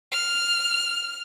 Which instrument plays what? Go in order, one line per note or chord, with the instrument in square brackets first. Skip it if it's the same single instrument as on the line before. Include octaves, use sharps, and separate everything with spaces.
[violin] F6